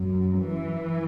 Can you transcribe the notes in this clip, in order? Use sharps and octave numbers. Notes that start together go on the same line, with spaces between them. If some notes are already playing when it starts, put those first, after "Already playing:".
Already playing: F#2
E3